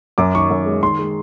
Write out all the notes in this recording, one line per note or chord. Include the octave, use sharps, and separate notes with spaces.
F#2 D6
D#3 C#6
F#2
G#3
D#3 C6
G#3